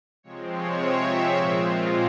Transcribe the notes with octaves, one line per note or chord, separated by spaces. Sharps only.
C3 F3 G#3 C4 C#5
C#5
E5
C#5
A#2 G#3 C4 F4